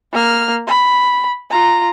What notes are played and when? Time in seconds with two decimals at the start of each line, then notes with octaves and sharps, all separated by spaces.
0.13 A#3 F6
0.67 B5
1.51 F4 A#5